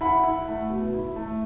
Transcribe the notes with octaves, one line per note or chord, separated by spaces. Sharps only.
E4 F#5 B5
E4
A3
B2
E4
A3